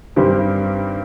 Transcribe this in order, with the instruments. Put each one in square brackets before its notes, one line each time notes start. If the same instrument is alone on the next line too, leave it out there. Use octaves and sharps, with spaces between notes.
[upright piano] G2 D#3 G3 C4 G4